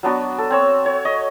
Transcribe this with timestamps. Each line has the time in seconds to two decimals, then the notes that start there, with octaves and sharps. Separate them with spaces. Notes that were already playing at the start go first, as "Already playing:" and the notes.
0.03 F#3 B3 D4 F#4
0.38 A4
0.50 C4 C#5 E6
0.86 C#5
1.05 D#5